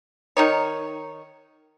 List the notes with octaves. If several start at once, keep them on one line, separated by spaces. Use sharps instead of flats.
D#3 D#4 C#5